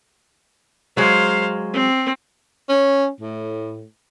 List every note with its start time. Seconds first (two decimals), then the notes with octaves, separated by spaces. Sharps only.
0.97 F#3 G#3 C5 F5
1.73 C4
2.70 C#4
3.21 A2